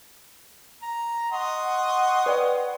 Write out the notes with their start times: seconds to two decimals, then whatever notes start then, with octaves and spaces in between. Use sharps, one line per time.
0.82 A#5
1.32 D#5 F#5 C6 C#6
2.26 B4 D5 G5